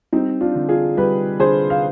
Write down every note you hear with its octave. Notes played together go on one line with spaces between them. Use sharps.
G3 C4 D#4
D4 F4
D3
F4 G#4
G3 G4 B4
D3 G#4 C5
F5